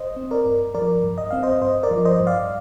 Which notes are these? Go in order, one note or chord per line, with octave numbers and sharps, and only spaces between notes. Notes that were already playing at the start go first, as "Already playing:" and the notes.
Already playing: C5 D#5
C4
A#4 D5
G2
F3 A#4 D5
G2
D#5
C4 F5
C5 D#5
G2 C5 D#5
A#4 D5
F3
C5 D#5
G2
D5 F5